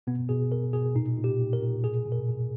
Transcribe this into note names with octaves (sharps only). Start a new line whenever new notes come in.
B2 B3
B2 G#4
B2 A#4
B2 G#4
A#2 D#4
A#2
G4
A#2
A#4
A#2
B2 G#4
B2
A#4
B2